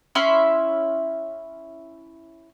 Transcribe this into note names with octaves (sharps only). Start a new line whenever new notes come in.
C#4 E4 E5 C6